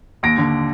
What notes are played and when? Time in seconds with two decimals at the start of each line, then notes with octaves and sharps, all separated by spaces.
0.23 D#2 A#6 D7
0.38 D3